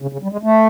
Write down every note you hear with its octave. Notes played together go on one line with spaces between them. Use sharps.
C#3
C#3
G3
G#3
A3